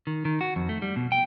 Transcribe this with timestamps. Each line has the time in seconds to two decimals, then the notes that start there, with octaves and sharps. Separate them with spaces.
0.07 D#3
0.25 D#3
0.41 F#4
0.56 F2
0.69 A3
0.82 G3
0.96 B2
1.12 G5